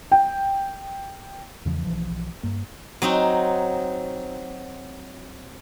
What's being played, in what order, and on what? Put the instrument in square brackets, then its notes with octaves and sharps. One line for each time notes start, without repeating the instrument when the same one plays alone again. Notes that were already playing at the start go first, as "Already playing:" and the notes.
[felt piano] G5
[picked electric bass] E2 C#3 E3 F3
B1 E3 F3
G2 A#3
[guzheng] F#3 C4 D#4 F#4